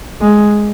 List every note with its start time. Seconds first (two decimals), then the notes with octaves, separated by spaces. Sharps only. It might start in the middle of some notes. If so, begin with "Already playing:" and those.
0.21 G#3